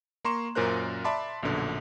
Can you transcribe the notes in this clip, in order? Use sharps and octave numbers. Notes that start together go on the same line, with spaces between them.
A#3 A#5 C6 C#6 E7
F#2 A#2 C#4 A#4 C5 F#6
D5 E5 A5 B5 C6 D6
A#1 F#2 B2 D3